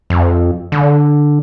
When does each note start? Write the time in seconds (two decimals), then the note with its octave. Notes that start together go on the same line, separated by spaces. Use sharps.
0.10 F2
0.72 D3